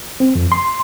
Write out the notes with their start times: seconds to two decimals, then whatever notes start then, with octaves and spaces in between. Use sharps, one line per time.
0.20 C4
0.35 F2
0.52 C6